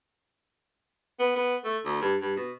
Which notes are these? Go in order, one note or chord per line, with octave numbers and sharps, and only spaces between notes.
B3
B3
A3
D2
G2
G2
B2